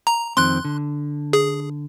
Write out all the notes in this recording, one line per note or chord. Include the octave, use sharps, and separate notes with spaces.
A#5
F2 D#3 C4 C6 F#6
D3
G#4